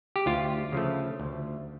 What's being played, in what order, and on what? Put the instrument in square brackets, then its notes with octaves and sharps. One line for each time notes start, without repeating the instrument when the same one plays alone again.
[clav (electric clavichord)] G4
D2 F4
C#3 F3 A3
D2